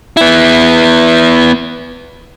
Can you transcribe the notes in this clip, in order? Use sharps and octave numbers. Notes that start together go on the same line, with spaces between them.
B3 E4